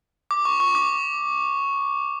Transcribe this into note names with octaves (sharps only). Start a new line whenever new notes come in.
D6
C#6
C#6
D6